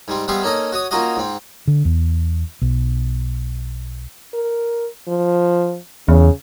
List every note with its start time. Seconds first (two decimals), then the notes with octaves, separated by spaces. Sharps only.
0.08 G#2 G3 C4
0.28 G3 G#3 B3 C4 E5 F5
0.42 A#3 C#4 D#4 A4 D#5
0.72 F#4 C#5 D#6
0.91 A#3 C#4 D#4 F4 F#4 D#5
1.16 G#2 C4
1.67 D3
1.85 E2
2.62 B1
4.34 A#4
5.08 F3
6.08 E2 C#3